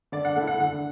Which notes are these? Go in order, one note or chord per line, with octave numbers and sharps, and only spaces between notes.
D3 D5
F#5
A3 E4 F#5
F#5
D3 F#5